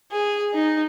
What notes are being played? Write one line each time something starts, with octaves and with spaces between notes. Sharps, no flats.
G#4
D#4